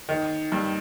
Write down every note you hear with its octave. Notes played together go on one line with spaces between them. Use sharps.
D#3
G2